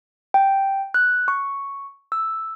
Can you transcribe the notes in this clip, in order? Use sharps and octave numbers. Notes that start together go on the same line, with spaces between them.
G5
F#6
C#6
E6